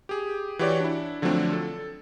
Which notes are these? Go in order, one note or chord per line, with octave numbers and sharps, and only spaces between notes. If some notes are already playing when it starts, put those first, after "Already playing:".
G4 G#4
E3 F#4 G4 C#5 D5
D4 E4
D3 F3 F#3 A3 C4 D4
A4